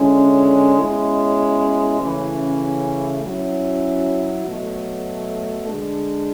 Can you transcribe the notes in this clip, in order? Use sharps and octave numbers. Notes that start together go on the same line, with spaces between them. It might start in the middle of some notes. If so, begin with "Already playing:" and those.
Already playing: D3 G#3 C#4 E4
B2 G#3 C#4 E4
C#3 E3 A3 C#4
F#3 C#4 E4
B2 F#3 A3
D3 G#3 D4